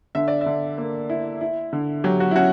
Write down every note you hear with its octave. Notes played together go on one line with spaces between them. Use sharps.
D3 E5
D5
E5
D3
A#3
E4
E4
D3
F#3 G4
F#4
E4
C#4 F#4